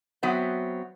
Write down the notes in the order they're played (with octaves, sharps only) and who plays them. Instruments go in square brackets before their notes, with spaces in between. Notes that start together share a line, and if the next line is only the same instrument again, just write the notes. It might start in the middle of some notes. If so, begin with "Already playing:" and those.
[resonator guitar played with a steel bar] F#3 B3 C4 E5